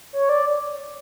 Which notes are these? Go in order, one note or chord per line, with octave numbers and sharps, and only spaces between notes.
C#5
D5